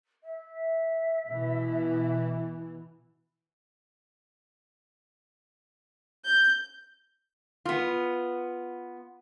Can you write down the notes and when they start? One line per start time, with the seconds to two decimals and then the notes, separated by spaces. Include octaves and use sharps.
0.24 E5
1.29 B2 E3
6.25 G6
7.65 B3 F4